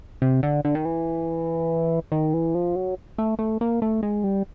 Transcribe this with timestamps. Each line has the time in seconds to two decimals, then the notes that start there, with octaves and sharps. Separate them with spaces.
0.22 C3
0.43 D3
0.65 D3
0.75 D#3
0.85 E3
2.12 D#3
2.34 E3
2.55 F3
2.75 F#3
3.18 A3
3.39 A3
3.61 A#3
3.82 A3
4.03 G#3
4.24 G3